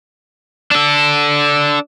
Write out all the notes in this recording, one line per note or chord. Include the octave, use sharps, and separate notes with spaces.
D4 A4